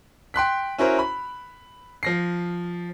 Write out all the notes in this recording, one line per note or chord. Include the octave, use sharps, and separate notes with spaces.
G5 C6 F#6 B6
C#4 E4 F#4 A#4 C5
B5
F3 A#6 C7